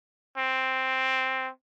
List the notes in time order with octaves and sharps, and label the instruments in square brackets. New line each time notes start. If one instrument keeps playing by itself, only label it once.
[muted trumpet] C4